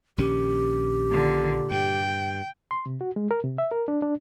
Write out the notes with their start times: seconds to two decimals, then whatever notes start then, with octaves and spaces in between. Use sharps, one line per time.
0.18 A#1 D#3 C#4 G4
1.10 A#2 D3
1.71 G2 G5
2.71 C6
2.86 C3
3.01 F#4
3.16 G#3
3.31 A#4
3.44 C3
3.58 E5
3.72 A#4
3.88 D4
4.02 D4